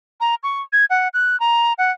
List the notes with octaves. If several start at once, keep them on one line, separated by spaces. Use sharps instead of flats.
A#5
C#6
G#6
F#5
F#6
A#5
F#5